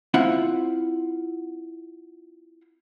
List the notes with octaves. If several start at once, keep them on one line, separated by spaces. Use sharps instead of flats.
C4 E4 F4 F#5